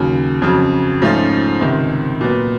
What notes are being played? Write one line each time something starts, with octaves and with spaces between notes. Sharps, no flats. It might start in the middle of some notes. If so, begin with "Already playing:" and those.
Already playing: D#2 C#3 F#3
F2 C#3 F#3
G#2 F3 A3 C#4 F4
C#2 C3 D#3
A#2 F#3 B3